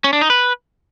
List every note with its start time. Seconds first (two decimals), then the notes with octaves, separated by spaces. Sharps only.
0.04 C#4
0.13 D4
0.21 D#4
0.30 B4